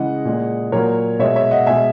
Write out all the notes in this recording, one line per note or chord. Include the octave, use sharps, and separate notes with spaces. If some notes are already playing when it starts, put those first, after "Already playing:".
Already playing: C#3 E3 G#3 D#5 F#5
A#2 G#3
A#2 F#3 A#4 C#5
B2 G#3 C#5 E5
C#5 E5
D#5 F#5
B2 G#3 E5 G#5